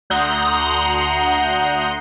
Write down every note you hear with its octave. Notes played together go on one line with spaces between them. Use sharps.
D2 F#5 A#5 C6 D#6 G6